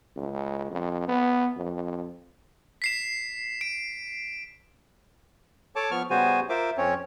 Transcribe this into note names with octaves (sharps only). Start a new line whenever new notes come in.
C#2
F2
B3
F2
B6 C7 E7
D7
A4 C#5 A5 D6
F3 B3 C#6 F6
C#3 G3 B3 F#4 C5 G#5
F4 A#4 C5 E5 D6
F2 C4 C#4 C#5